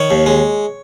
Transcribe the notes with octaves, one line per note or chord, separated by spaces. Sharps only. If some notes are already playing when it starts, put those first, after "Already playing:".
Already playing: D#3 C#5
D#2
G#3